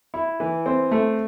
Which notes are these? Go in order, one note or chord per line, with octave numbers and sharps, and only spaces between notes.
E4
E3
C4
A3